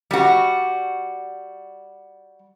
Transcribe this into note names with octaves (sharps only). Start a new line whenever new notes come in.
G3 F#4